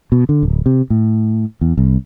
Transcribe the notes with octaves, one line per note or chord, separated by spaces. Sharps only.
B2
D3
D1
C3
A2
E2
C2